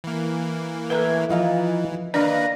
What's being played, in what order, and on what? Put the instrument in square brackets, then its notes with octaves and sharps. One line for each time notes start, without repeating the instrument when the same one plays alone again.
[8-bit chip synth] E3 A#3
[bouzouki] A2 E5 A#5 [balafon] A4 B4 [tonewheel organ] G#5
[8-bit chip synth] E3 [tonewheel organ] F3 [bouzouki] D#4 F4 A#5
[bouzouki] D#3 F5 [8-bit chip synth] A#3 B4 [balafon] D4 D5 [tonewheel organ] A#5